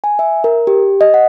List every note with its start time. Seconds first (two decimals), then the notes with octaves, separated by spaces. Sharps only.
0.04 G#5
0.19 E5
0.44 A#4
0.67 G4
1.01 D#5
1.14 F#5